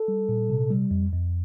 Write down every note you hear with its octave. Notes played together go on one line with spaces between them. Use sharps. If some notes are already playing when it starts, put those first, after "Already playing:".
Already playing: A4
G3
A#2
C3
G3
F2
F2